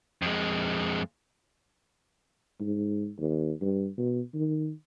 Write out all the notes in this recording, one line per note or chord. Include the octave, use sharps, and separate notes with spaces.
F2 G#3
G#2
D#2
G2
B2
D#3